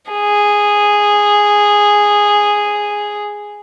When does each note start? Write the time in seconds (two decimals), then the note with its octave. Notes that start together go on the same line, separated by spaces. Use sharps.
0.12 G#4